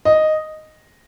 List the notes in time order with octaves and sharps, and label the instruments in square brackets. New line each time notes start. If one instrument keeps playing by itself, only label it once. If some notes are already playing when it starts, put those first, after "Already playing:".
[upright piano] D#5